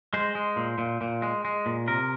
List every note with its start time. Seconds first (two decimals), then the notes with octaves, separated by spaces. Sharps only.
0.13 G#3 C5
0.35 G#3
0.56 A#2
0.78 A#2
1.01 A#2
1.22 G#3
1.45 G#3
1.66 A#2
1.88 C3 A#4